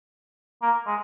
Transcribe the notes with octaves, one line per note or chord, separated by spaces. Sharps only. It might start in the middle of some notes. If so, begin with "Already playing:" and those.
A#3
G#3